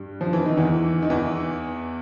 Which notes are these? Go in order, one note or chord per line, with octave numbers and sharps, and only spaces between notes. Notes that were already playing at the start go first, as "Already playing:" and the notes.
Already playing: G2 G3
F3
E3
D#3
E2 E3
D#3
E2 E3